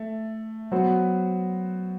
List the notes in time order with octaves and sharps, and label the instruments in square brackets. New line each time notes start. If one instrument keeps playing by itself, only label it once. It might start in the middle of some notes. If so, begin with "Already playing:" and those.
Already playing: [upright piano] A3
F#3 B3 F#4 C5